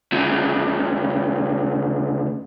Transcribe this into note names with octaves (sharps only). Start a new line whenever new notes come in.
D2 C#3